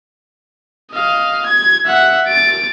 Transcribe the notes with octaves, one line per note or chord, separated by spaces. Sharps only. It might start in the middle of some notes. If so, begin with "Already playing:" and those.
D#5 F5
G#6
E5 F#5
A6 D7